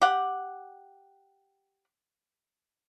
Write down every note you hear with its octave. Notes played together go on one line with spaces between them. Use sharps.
G4 F#5